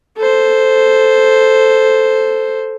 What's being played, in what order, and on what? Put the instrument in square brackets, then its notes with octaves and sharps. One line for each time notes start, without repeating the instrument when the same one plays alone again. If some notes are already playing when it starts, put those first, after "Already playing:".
[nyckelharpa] A4 C5